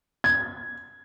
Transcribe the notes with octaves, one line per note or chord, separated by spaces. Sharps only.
G#6